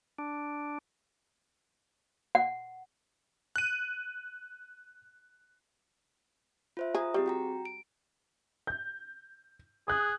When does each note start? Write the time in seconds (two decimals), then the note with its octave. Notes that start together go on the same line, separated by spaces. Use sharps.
0.18 D4
2.35 F#5
3.56 F#6 D#7
6.77 F4 C5 E5
6.95 F4 G#4 A#5 D#6
7.14 G3 C4 G4 G#4
7.26 F#4 G5 A#5
7.65 D7
8.67 G6
9.88 G#4 D#6 F#6